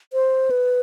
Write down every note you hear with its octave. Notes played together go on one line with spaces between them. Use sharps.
C5
B4